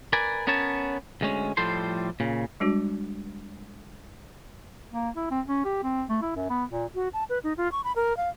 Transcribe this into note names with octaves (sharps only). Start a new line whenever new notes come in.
A#4 B4 D5 G#5
B3 C#4 A#4 C#5 A5
D2 G#3 C#4
A2 F3 G3 A4 C5 C6
A#2 C#3
G3 G#3 D4 F#4
A#3
E4
C4
C#4
G4
C4
A3
E4
F#2
B3
A#2
F#4
A5
B4
D#4
F4
C#6
B5
A#4
F5